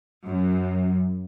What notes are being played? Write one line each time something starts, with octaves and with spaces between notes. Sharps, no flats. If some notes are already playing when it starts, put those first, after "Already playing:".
F#2